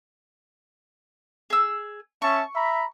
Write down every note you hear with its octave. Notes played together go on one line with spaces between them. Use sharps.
G#4 E6
C#4 E5 A5 C#6
E5 A#5 B5